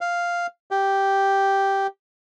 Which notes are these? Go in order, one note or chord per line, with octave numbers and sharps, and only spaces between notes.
F5
G4